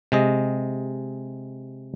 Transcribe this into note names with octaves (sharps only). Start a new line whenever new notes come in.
C3 G#3 D#5